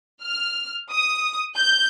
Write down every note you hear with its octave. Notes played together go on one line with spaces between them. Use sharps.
F6
D#6
G6